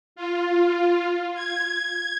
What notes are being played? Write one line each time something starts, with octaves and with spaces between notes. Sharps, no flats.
F4
G#6